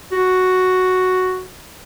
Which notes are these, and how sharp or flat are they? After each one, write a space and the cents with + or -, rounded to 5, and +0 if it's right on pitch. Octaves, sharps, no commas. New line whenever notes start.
F#4 +0